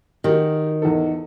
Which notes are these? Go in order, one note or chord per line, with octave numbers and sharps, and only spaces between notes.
D#3 F#4 G4
E2 D#4 A4